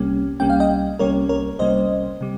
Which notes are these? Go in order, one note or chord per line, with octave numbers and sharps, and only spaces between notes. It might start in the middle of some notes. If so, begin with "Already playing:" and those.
Already playing: C2 C3 G3 A#3 C#4
C2 C3 G3 A#3 C#4 G5
F5
D#5 G5
C2 C3 G3 A#3 C#4 A#4 C#5
A#4 C#5
C2 C3 G3 A#3 C#4 C5 D#5
C3 G3